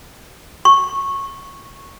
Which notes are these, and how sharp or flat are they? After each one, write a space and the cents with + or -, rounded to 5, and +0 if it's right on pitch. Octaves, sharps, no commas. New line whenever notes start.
C#6 -15